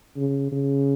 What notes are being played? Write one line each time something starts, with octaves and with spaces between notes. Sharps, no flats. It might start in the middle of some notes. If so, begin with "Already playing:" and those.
C#3
C#3